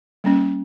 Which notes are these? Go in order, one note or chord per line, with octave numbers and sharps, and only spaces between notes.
G3 A#3 C#4